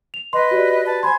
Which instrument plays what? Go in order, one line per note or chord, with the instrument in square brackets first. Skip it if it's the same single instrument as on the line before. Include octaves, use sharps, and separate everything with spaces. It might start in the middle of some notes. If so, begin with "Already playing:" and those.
[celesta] F7
[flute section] B4 D#5 [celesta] C6
[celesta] F#4 G4 D5
[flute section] B4 A5
[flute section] C5 G#5 G#6 [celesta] B5 C6